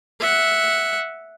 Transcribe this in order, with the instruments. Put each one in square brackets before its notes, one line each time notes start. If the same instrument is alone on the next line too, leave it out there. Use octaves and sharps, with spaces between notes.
[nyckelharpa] E5 F#5